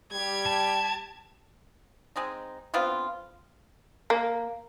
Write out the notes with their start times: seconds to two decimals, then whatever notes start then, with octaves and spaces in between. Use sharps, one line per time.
0.12 G3 G4 G#6
0.46 A5
2.16 G#3 C4 D#4
2.74 D3 B3 C4 F4
4.10 A#3